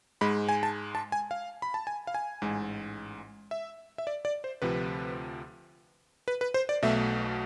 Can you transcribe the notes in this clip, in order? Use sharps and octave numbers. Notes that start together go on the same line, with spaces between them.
G#2 G#3 B5
G#5
A5
A5
G#5
F5
B5
A5
G#5
F5
G#5
A1 G#2 G#3
E5
E5
D5
D5
C5
D2 C3 F3 B4
B4
B4
C5
D5
B1 B2 A3 E5